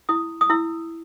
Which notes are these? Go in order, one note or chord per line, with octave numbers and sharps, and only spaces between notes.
E4 D#6
D#6
E4 E6